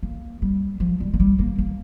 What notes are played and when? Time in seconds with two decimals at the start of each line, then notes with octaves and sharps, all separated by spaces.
0.03 A#3
0.42 G3
0.80 F3
1.00 G3
1.14 A#3
1.20 G3
1.39 A#3
1.58 A#3